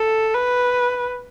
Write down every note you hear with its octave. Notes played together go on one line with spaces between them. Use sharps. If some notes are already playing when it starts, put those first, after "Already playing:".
Already playing: A4
B4